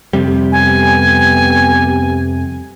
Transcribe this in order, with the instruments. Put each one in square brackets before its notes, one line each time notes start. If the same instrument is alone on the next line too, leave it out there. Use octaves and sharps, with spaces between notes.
[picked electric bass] F2 C3 G3
[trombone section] A3 B3 G4 [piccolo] G#5